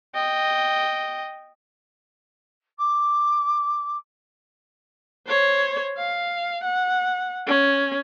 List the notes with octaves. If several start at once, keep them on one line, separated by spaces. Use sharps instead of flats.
D#5 G5
D6
C5 C#5
F5
F#5
C#4